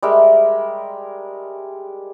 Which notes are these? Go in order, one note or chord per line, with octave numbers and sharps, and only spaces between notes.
G3 G#3 A#4 E5